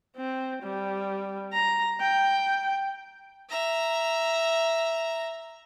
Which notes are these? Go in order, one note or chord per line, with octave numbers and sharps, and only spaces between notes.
C4
G3
A#5
G5
E5 A#5